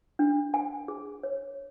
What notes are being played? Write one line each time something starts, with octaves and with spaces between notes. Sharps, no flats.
D4
G#5
G#4
C#5